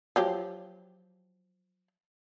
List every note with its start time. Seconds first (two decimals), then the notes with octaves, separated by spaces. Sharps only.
0.16 F3 F#3 G4